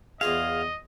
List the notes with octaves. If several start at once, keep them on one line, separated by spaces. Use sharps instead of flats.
E2 F4 G#4 D#5 F5